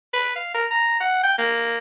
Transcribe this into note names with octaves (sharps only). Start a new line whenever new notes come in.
B4
F5
A#4
A#5
F#5
G5
A#3